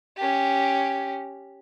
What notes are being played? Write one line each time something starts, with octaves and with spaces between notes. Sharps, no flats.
C#4 G4